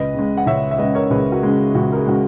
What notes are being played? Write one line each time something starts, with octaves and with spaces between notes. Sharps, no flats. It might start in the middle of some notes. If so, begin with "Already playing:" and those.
Already playing: C#2 B4 D#5
C#3 G#3
F#5
C#2 C#5 E5
E5
C#3 G#3 B4 D#5
A#4 C#5
C#2 G#4 B4
F#4 A#4
C#3 G#3
C#2 F#4
A#4
G#4
C#3 G#3 F#4